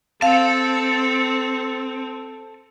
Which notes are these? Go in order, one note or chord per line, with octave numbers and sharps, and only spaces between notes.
C4 A4 F5 A5